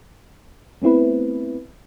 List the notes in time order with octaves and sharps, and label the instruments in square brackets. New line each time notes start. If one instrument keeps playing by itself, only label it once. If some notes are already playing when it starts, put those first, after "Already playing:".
[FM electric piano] A3 B3 C4 E4 B4